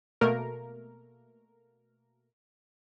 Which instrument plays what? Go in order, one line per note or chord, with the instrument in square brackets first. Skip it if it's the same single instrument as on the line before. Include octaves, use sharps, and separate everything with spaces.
[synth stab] B2 A3 A#3 A#4